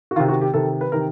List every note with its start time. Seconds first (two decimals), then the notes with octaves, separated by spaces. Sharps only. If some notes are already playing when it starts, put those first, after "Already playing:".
0.11 F#4
0.16 D#3 F4
0.19 C3
0.29 F#4
0.41 G4
0.54 C3 D#3 A4
0.81 B4
0.92 C3 D#3 A#4